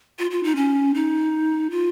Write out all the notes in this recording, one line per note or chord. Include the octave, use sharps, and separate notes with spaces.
F4
F4
D#4
C#4
D#4
F4